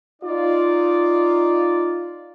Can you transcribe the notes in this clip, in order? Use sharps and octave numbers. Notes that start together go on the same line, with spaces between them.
D#4 F4 D5